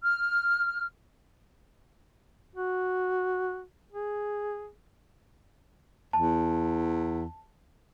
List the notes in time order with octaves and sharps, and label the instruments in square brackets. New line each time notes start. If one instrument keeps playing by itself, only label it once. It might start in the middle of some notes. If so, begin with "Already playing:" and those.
[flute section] F6
[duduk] F#4
G#4
[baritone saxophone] E2 [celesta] A5